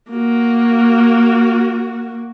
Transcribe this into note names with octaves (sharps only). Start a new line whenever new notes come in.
A#3 F#4